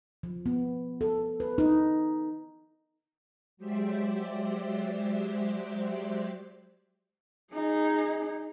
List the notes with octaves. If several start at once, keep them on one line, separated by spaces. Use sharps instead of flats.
F3
B3
A4
B4
D#4
F#3 G#3 G4 C5 D5 E5
D#4 G#4